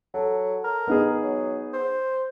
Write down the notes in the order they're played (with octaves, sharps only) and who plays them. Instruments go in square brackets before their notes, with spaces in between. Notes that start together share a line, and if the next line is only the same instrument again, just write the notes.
[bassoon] F#3 [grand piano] A4
[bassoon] A#4
[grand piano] B3 D#4 G#4
[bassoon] F#3
C5